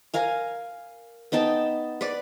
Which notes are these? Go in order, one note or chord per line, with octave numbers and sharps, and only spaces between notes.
A#4 F5 G#5
B3 D#4 G5 A5
B4 D5